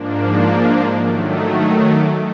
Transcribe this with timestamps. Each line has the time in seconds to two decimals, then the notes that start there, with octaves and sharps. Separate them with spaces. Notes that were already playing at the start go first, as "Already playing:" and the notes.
Already playing: G#2 F3 A#3 D4
1.03 D#3 F#3 A3 D6
1.32 D#6
1.60 D#6
1.88 D6